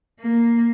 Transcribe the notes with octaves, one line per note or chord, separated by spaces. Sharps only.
A#3